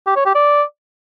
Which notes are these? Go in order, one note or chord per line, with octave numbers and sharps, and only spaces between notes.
G4
C#5
G4
D5